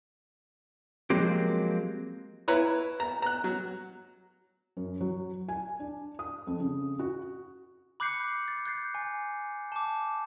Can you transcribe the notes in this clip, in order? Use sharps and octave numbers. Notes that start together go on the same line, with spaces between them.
F3 F#3 G#3 A#3 C4 G4
E4 B4 C#5 A#5
A#5
A#5 F#6
F#3
F#2
F#3
G#5
D4
D#6
F2
C#3
F#4
B5 D6 F#6 G6 C7 C#7
A6
F#6 G6 A6 C7
G#5
A5 D6